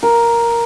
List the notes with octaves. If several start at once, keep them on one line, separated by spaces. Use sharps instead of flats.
A#4